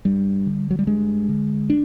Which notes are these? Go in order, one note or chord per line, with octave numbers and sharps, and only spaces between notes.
G2 G3
D3
F#3
G3
G2 G#3
D3
D4